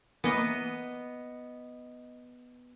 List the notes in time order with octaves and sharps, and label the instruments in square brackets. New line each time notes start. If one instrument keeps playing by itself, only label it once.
[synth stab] E3 A#3 [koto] B3 D#5